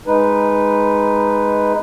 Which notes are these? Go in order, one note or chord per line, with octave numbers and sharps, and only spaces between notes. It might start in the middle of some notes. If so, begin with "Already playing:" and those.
G#3 D#4 B4